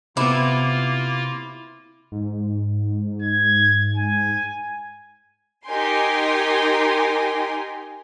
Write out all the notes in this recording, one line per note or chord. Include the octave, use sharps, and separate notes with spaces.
C3 A#3 B3 E4 F4 D6
G#2
G#6
G#5
D#4 G4 A#4 G5 G#5 C6